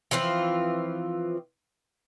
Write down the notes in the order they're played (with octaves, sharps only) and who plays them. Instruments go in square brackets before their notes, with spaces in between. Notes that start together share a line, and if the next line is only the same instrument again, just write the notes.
[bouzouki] E3 F3 C4 F4